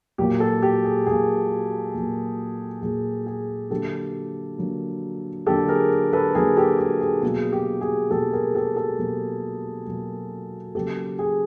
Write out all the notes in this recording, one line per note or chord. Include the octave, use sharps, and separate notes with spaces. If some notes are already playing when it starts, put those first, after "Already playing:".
A#2 F#3 A#3 G4
G4 A4
G4
G#4
A#2 F#3 A#3 G#4
A#2 F#3 A#3
A#2 F#3 A#3 G#4
G#4
D3 F#3 A#3 G4 A4
D3 F#3 A#3
D3 F#3 A#3 G4 A4
G#4 A#4
A4 B4
D3 F#3 A#3 G#4 A#4
G4 A4
G4
G#4
B2 F#3 A#3 G#4
G4
G#4
B2 F#3 A#3 G4 A4
G#4 A#4
G4 A4
G4 A4
B2 F#3 A#3
B2 F#3 A#3
C#3 F#3 A#3 G4 A4
G#4